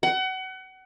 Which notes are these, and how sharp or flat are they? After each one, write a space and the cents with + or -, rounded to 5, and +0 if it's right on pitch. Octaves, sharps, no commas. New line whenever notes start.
F#5 +30